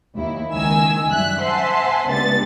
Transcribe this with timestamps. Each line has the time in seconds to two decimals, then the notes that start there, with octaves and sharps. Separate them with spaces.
0.16 D#2 E4
0.52 C#2 D#3 G#5 E6
1.09 F#2 G3 E5 F#6
1.41 C5 E5 F#5 G#5 A5 C6
2.09 C#2 G2 B3 D4 A6